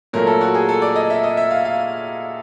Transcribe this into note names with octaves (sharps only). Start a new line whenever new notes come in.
A#2 F#3 A3 A#4
A4
F#4
G#4
A4
D5
D#5
E5
D#5
E5
F5
F5